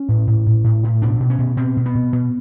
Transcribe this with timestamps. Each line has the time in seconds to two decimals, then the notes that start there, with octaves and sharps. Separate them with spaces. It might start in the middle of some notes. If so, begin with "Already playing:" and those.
Already playing: C#4
0.08 A2
0.27 A2
0.46 A2
0.64 A2
0.83 A2
1.02 B2 D4
1.20 B2
1.30 C#4
1.39 B2
1.57 B2 C4
1.77 B2
1.86 B3
1.95 B2
2.13 B2